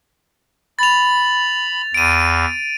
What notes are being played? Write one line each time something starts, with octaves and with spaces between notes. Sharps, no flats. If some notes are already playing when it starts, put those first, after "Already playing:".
B5 A6 F7
E2 D7 D#7